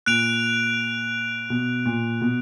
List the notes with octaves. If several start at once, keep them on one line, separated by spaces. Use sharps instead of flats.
A#2 F#6 D7 F7
B2
A#2
B2